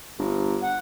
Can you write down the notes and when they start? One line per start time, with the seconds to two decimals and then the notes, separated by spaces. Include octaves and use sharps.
0.19 G1
0.63 F#5